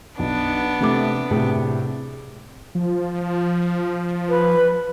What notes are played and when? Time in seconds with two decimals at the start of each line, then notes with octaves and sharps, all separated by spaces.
0.19 B1 B3 D4
0.81 C3 A3 D6
1.31 A2 C3 G#4
2.75 F3
4.29 B4